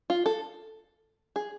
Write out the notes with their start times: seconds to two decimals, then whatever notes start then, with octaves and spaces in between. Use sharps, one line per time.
0.10 F4
0.26 A4
1.36 G#4